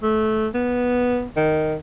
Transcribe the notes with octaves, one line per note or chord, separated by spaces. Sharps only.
A3
B3
D#3